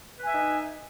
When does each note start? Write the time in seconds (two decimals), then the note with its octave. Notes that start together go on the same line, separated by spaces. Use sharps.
0.20 B4
0.24 G#5
0.27 E5
0.31 D#4